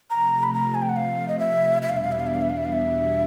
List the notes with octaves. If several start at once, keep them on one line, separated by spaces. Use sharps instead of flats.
C3 F3 A3 A#5
B5
A#5
G#5
G5
F#5
F5
D#5
E5
E2 B2 G3 B3 D4 E5
F5
E5
F5
E5
F5
E5
F5
E5
F5
E5
F5
E5